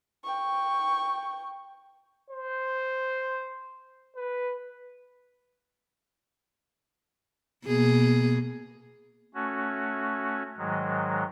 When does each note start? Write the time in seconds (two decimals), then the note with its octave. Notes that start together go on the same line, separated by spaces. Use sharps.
0.24 G5 C#6
2.30 C5
4.16 B4
7.66 B2 A#3 G#4
9.34 A3 C#4 F#4
10.58 G#2 D#3 F#3 G#3